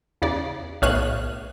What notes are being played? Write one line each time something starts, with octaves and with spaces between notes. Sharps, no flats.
E2 C#3 D5
B1 A2 C#5 F5 F#6 D#7